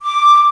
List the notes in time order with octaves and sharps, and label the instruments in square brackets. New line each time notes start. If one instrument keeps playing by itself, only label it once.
[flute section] D6